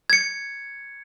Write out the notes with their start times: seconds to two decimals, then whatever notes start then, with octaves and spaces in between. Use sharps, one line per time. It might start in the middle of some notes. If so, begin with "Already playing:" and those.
0.10 G#6 C#7